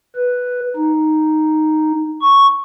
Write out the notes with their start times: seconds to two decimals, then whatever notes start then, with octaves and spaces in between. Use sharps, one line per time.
0.16 B4
0.77 D#4
2.21 C#6